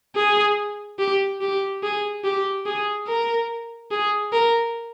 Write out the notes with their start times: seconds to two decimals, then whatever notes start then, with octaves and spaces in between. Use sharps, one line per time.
0.16 G#4
0.99 G4
1.41 G4
1.83 G#4
2.24 G4
2.66 G#4
3.07 A#4
3.91 G#4
4.32 A#4